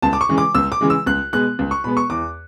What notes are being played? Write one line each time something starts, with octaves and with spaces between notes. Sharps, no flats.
C#2 A5
D6
C#6
C#3 E3 G#3
D6
C#2 E6
D6
C#3 E3 G#3
E6
C#2 F#6
B2 G#3 B3 F#6
C#2
C#6
B2 G#3 B3 B5
C#6
E2 D6